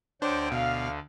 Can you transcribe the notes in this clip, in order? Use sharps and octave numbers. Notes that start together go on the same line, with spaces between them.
D2 D3 D4 C5 C#5 G5 D6
B2 F5